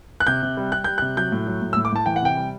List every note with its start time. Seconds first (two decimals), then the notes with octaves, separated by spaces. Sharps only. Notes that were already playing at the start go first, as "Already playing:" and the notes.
0.20 F#6
0.27 C3 G6
0.43 C3
0.57 G3
0.72 G3 F#6
0.84 G3 G6
0.98 F#6
1.02 C3
1.17 F#3 G6
1.32 A2
1.47 F#3
1.62 A2
1.73 E6
1.77 A2
1.85 D6
1.92 A2 A5
2.06 E3 G5
2.16 F#5
2.22 C3 G5
2.37 G3